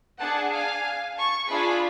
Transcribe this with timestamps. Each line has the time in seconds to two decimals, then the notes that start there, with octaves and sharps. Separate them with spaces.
0.20 D4 G#4 F#5 A5
0.52 F5 G#5
1.16 A5 C#6
1.48 D4 F4 G#4 G#5 B5